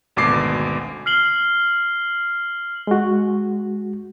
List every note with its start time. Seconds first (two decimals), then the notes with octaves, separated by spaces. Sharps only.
0.16 G#1 D2 B2 D6 C7
1.06 F6 C7 F#7 G7
2.87 G#3 F#4